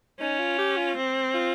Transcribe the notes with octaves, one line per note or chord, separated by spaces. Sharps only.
C#4 D#4
F4
G4
F4
C4
F4